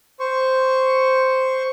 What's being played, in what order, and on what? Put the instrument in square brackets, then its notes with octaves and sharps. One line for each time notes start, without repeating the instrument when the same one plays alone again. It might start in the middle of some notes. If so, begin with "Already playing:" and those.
[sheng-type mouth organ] C5 C#6